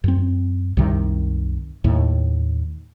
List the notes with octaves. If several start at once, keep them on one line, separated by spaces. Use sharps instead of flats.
F#2 C4
C2 F#2 C3 D#3
D#2 A2